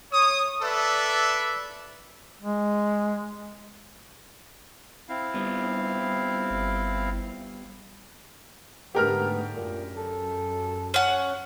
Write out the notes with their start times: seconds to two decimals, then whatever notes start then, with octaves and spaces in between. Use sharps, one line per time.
0.12 C#5 D#6
0.62 A4 B4 D5 E5
2.41 G#3
5.09 C4 E4 F5
5.34 G2 B3
6.51 G1
8.95 G#2 D3 A3 B3 G4 A#4 F6
9.56 F#2 A#2
9.97 A4
10.94 C#4 F#5